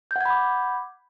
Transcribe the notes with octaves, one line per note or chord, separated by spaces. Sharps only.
F#5 B5 D6 G6 G#6